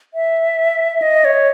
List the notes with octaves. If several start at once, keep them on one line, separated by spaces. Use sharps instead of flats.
E5
D#5
C#5